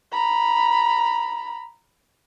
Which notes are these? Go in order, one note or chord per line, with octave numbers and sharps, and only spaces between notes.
A#5 B5